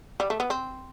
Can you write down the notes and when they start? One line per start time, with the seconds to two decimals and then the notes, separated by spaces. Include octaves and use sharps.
0.20 G3
0.30 A3
0.40 B3
0.50 C4